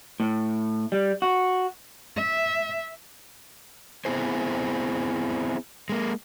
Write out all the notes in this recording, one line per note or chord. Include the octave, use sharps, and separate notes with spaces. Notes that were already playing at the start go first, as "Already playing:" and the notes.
A2
G3
F#4
E5
B3 C4 E4 G#4 C5
G#3 A#3